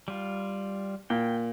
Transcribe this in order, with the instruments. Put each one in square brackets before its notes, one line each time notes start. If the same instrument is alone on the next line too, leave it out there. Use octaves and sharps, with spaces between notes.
[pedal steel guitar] G3 F4
[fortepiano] A#2 [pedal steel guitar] G5